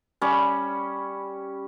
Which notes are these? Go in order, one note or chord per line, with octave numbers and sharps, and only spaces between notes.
G3 C#4 B5